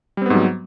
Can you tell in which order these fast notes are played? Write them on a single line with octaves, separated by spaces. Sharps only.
G3 C4 B3 G#2 F#3